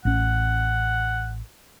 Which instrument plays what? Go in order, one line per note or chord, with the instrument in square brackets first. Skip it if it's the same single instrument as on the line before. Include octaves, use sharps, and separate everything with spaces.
[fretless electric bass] A1 C#4 [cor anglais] F#5